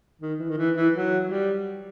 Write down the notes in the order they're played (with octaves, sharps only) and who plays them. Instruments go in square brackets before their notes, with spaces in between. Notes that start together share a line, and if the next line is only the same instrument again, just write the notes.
[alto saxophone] D#3
E3
D#3
E3
E3
F#3
G3